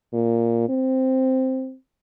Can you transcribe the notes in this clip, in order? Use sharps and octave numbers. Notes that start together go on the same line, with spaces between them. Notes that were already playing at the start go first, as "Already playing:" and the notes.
A#2
C4